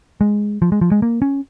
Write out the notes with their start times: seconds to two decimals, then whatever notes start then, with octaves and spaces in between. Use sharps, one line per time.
0.21 G#3
0.62 F3
0.72 G#3
0.81 F3
0.92 G#3
1.02 A#3
1.22 C#4